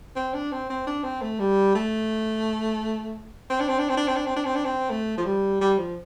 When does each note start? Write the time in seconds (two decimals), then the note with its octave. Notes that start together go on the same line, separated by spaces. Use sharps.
0.16 C4
0.34 D4
0.52 C4
0.70 C4
0.87 D4
1.04 C4
1.22 A3
1.40 G3
1.75 A3
3.50 C4
3.60 D4
3.69 C4
3.79 D4
3.89 C4
3.97 D4
4.07 C4
4.16 D4
4.26 C4
4.36 D4
4.45 C4
4.55 D4
4.65 C4
4.90 A3
5.18 F3
5.26 G3
5.61 G3
5.78 F3